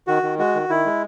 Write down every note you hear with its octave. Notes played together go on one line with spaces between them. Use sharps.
D#3 F#4
D#3
G#3 F#4
D#3
D#3 E4
G#3